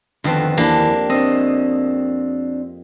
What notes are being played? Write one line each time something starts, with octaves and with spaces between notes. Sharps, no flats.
F2 D3 D#3 B3 C4
D#2 E3 A#3 D4 G4
C4 D4 D#5